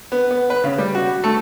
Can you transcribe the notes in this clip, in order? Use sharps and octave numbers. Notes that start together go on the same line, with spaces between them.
B3
B3
B4
C#3
G3
F#4
A3